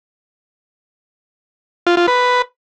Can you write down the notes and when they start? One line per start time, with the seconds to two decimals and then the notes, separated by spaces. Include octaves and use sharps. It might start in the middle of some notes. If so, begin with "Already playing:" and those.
1.87 F4
1.97 F4
2.08 B4